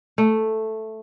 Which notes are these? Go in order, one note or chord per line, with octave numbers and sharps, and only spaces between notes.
A3